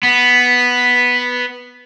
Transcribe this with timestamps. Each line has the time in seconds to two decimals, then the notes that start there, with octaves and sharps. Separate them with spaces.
0.03 B3 B6